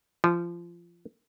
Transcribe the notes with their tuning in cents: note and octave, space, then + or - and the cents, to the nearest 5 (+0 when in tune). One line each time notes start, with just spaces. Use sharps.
F3 -25